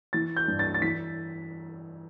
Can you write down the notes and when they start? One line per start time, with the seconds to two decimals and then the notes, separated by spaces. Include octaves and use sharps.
0.13 E3 A6
0.37 G6
0.48 G2
0.59 A6
0.74 A6
0.82 E3 B6